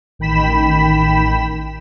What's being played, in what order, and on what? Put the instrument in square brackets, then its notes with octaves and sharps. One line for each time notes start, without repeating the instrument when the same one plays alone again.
[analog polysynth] A1 D#3 G5 B5 B6 E7